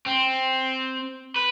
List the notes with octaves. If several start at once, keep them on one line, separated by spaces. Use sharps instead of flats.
C4
B4